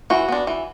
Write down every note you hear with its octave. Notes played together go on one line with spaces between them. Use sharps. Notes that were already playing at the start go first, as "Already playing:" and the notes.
E3 F#4
B3 D4
E3